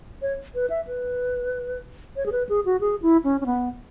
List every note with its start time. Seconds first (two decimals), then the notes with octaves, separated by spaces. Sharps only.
0.22 C#5
0.55 B4
0.70 E5
0.87 B4
2.16 C#5
2.26 G#4
2.32 B4
2.49 G#4
2.65 F#4
2.81 G#4
3.02 E4
3.24 C#4
3.41 C#4
3.46 B3